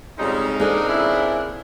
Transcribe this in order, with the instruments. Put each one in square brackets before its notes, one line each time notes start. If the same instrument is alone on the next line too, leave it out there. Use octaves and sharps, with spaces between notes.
[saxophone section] F2 C#3 G3 [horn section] G#3 D#4
[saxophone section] C#3 C4 D4 [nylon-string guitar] A#3 G#4 A4
[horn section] C#4 E4